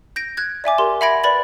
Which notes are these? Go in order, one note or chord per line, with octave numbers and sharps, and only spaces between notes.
G6 A#6 D7
F#6 G#6
D5 E5 G#5 D6
G4 A#4 C6
E5 F#5 B5 G#6 A#6 D7
B4 D5 B5 A6 F#7